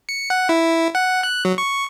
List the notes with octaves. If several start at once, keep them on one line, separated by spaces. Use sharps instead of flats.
C#7
F#5
E4
F#5
F#6
F#3
C#6